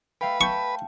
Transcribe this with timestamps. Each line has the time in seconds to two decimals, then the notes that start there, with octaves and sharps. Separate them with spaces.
0.21 A3 B4 F5 G5
0.41 G5 A5 C#6 G6